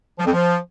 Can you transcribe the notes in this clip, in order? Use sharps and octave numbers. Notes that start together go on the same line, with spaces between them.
F3
F2
F3